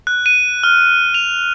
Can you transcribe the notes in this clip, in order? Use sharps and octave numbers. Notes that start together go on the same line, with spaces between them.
F#6
D#7
F6
F7